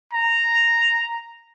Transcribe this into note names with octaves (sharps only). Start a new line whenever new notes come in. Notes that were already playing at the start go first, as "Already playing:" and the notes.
A#5